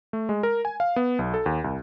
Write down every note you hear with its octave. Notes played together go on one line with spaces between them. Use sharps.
A3
G#3
A#4
G#5
F5
B3
B1
A4
D#2
C2